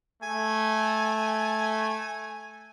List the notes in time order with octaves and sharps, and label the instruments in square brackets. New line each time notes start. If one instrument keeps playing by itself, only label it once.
[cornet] A3 [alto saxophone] G#5